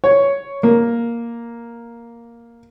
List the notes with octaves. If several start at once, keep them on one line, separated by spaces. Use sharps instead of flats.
C#5
A#3